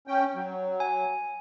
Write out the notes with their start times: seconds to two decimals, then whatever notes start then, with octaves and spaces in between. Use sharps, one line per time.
0.07 C#4 G5
0.35 F#3
0.80 G#5